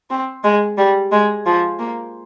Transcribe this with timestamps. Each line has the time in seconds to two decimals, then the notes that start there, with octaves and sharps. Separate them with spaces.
0.10 C4
0.44 G#3
0.78 G3
1.12 G#3
1.46 F3
1.79 A#3